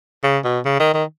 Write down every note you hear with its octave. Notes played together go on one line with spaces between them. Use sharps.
C#3
B2
C#3
D#3
D#3